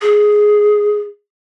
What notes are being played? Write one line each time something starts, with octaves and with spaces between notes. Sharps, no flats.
G#4